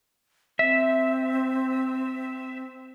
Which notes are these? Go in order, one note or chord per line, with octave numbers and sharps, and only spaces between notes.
C4 E5